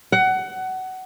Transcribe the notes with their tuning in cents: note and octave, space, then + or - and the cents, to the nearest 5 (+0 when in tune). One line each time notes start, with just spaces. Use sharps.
F#5 +20